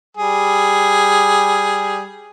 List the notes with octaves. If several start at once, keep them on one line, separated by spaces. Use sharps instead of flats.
G3 G#4